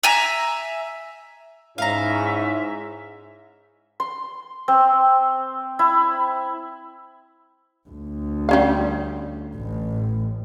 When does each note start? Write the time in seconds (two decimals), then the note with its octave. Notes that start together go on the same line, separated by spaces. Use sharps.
0.03 E5 G#5 A#5
1.78 G#2 C#4 D#4 E4 E5 F5 A#5
4.00 C6
4.68 C4
5.79 E4
7.89 D2
8.49 G3 C#4 F5
9.56 A1